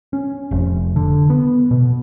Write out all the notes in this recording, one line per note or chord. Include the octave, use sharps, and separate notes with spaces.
C#4
F1
D3
B3
B2